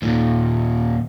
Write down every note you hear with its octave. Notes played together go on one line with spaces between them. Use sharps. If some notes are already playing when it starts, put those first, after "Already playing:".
D#2 A#2